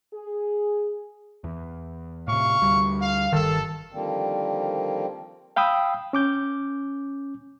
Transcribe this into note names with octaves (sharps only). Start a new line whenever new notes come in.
G#4
E2
A2 C3 F5 C#6
D2 G3
F5
G1 D#3 A4
D3 D#3 F3 G3 A#3 C4
F5 G5 B5 D#6 E6
C#4 D6 G6